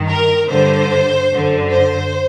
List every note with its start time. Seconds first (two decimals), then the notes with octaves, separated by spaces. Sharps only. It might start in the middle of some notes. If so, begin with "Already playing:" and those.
Already playing: G2 D#3
0.09 A#4
0.50 G2 D3 C5
1.31 F#2 D3
1.72 C5